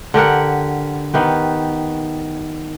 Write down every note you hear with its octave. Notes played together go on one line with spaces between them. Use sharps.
D3 G4 A#4 F#5
D#3 B3 G4